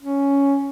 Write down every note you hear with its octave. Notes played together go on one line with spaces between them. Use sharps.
C#4